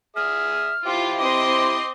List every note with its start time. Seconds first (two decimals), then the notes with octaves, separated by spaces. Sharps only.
0.16 G#4 E5 D#6 F6
0.87 E4 F4 G4 C5
1.20 C4 D#5 C6 D6